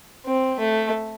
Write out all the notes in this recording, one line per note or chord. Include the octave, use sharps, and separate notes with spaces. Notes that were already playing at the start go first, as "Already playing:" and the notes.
C4
A3